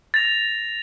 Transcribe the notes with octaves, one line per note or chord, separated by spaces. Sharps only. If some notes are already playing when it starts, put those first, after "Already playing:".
A6 A#6 F7